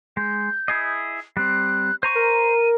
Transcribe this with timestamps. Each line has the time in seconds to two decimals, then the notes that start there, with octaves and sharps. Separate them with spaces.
0.17 G#3 G6
0.68 E4 G#4 D#5
1.37 G3 C4 F#6
2.03 C5 A#5 C#6 D#7
2.15 A#4